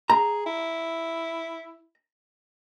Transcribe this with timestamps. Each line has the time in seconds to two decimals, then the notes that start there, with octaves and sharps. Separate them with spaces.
0.10 G#4 A#5
0.46 E4